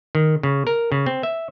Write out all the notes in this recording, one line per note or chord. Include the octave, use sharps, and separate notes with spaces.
D#3
C#3
A#4
C#3
C4
E5